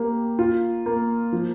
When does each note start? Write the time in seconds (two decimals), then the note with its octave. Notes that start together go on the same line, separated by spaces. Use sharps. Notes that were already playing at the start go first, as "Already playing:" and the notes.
Already playing: A#3 G4
0.39 F4
0.86 A#3
1.32 F3